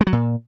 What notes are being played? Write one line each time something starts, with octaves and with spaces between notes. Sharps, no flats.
G#3
F#3
A#2